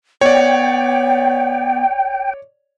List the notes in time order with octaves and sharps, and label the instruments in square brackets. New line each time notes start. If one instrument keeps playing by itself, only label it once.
[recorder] B3 [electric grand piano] C#5 D5 [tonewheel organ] G5